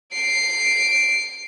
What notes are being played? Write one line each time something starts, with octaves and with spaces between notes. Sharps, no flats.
C7 D7